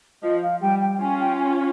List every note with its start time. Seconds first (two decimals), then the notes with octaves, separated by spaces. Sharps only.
0.23 F3 D#5
0.42 F5
0.62 G3 G5
0.80 G5
1.00 C#4 F4 G#5
1.20 G5
1.39 G#5